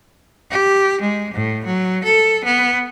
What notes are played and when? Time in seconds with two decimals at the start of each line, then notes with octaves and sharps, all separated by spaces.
0.51 G4
1.01 G#3
1.34 A2
1.65 F#3
2.04 A4
2.44 B3